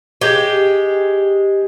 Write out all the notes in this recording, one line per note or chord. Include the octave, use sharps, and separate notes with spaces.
G#3 G4